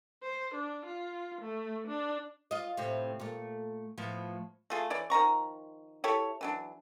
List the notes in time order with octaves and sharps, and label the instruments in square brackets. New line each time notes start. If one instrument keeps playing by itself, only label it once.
[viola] C5
D4
F4
A3
D4
[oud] F4 D#5
A2 C3 C4
A#2 A3
A2 F3 B3
[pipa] A3 F4 G#4
E3 C#5 D5
D#3 F3 A#5 C#6
E4 G4 A4 C#5
E3 F#3 D4